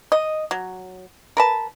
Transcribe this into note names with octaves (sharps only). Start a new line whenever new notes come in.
D#5
F#3
A#4 B4 A5